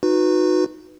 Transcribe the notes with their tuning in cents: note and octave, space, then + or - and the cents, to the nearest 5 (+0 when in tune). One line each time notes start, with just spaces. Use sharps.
D#4 +0 F#4 -25 B4 +0